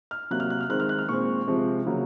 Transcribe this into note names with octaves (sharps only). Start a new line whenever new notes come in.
F6
C3 F#3 A#3 F#6
F6
F#6
F6
D#3 G#3 C4 F#6
F6
F#6
F6
A#2 G#3 C4 C#6
C3 F3 G#3 C4
C#3 F#3 A#3